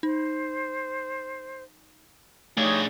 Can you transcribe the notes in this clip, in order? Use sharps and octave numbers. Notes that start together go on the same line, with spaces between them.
D#4 C5
A3 D4 D#4 G4 G#4 C#5